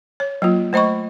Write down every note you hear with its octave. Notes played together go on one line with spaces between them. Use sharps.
C#5
F#3 A#3 F4
A3 C5 D#5 B5 C#6